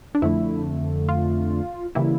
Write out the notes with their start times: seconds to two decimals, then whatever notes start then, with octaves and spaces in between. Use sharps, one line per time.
0.15 D4
0.22 F2 D3 A3 E4
1.09 F4
1.95 C#3 E3 G3 A#3 E4